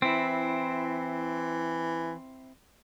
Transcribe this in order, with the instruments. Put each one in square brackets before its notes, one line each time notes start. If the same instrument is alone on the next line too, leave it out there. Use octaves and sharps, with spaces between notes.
[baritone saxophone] E3 [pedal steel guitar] C4 E4